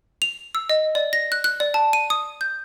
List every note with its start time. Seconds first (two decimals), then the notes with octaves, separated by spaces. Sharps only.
0.22 F7
0.55 E6
0.70 D#5
0.95 D5
1.13 A#6
1.32 F#6
1.44 F#6
1.60 D5
1.74 A5
1.93 D#7
2.10 D#6
2.41 G6